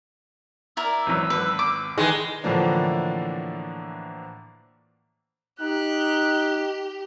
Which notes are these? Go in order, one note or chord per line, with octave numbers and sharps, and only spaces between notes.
E4 A#4 D5 E6
G#1 E3 F#3
G#1 B4
D6
D#3 E3 G#3 B4 A#6
A2 D3 E3 F3 A#3 D4
D#4 G4 F#6